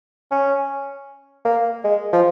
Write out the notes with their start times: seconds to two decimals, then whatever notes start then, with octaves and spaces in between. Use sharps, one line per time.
0.31 C#4
1.45 A#3
1.84 G#3
2.13 F3